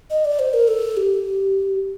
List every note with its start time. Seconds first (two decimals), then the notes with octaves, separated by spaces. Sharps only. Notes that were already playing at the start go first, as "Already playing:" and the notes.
0.10 D#5
0.25 D5
0.39 C5
0.54 A#4
0.68 A4
0.97 G4